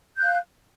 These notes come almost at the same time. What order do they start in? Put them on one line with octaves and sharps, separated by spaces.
G6 F#6 F5